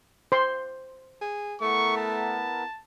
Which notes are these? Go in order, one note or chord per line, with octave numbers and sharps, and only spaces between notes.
C5 C6
G#4
A3 B3 E4 A#4 C#6
A5